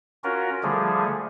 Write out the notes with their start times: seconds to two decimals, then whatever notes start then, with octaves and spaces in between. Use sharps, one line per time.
0.24 C#4 F4 F#4 A#4
0.63 D3 F3 G3 A3 G#4